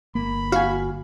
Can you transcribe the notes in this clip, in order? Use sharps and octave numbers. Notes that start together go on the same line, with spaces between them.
G1 A#3 B5
F#4 F5 G#5